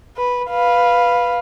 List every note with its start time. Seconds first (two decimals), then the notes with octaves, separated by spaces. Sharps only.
0.17 B4
0.50 B4 F5